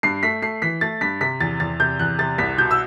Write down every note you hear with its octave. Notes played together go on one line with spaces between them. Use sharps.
G2 C7
A3 B6
A3 C7
E3 B6
A3 A6
G2 B6
C3 B6
E2 A6
E2 A6
C3 G6
E2 F#6
C3 A6
C2 B6
B2 G6
E6